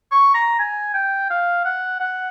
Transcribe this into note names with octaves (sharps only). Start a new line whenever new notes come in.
C#6
A#5
G#5
G5
F5
F#5
F#5